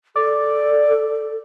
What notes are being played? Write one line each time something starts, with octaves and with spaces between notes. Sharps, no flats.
A4 D5